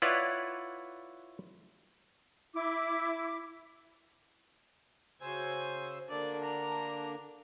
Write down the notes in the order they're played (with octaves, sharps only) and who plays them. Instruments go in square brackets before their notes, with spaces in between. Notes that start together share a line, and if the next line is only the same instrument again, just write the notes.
[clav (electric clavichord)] E4 F4 B4 C#5 D5 F#5
[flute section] E4 D6
[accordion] C#3 C5 E6 [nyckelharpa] F#4 G#5
[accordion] D3 A#3 D4 [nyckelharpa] D5
[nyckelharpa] A#5